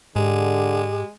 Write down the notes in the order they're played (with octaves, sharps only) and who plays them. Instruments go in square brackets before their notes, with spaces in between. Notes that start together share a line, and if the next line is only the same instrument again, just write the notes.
[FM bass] G#2 [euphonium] D3 [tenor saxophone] G#3 [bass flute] G4